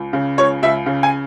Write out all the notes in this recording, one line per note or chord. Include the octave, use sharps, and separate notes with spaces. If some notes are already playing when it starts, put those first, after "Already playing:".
Already playing: C#2
C#3
C#2 C#5
C#2 E5
C#3
G#5